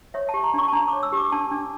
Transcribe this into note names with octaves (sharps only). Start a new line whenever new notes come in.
C#5 E5
A5
G4
A#5
D4 C#6
A5
D4 A#5
D6
C#5
E6
G4 D6
D4 A5
D4